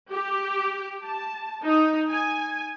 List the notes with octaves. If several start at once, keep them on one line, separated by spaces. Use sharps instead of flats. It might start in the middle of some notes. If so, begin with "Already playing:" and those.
G4
A5
D#4
G#5